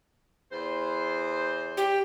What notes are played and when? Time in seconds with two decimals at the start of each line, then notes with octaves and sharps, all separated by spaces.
0.52 E2 C5
1.77 G4